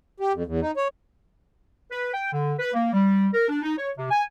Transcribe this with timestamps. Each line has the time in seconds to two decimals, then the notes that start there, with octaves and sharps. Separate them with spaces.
0.20 G4
0.34 F2
0.46 E2
0.62 D#4
0.77 C#5
1.91 B4
2.14 G5
2.32 D3
2.59 B4
2.74 A#3
2.93 G3
3.33 A#4
3.49 D4
3.62 D#4
3.78 C#5
3.97 C3
4.11 G#5